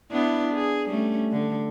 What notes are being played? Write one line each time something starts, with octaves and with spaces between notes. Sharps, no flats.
B3 D4 E4
G#4
G3 A3 C#4
D3